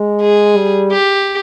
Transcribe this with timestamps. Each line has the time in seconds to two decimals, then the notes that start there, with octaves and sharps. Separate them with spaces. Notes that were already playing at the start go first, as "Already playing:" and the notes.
Already playing: G#3
0.22 G#4
0.56 G3
0.92 G4